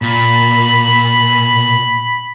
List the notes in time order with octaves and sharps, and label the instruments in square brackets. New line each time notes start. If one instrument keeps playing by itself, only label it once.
[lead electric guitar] A#2 [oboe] B5